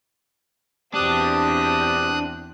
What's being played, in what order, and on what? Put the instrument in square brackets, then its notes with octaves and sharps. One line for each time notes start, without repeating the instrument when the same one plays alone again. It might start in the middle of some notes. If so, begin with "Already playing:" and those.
[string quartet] E2 C4 [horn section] B2 G4 [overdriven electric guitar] D4 [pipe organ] D#6 F#6